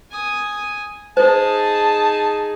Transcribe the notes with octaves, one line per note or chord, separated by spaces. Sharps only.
G#5 D#6
D#4 G#4 C5 A5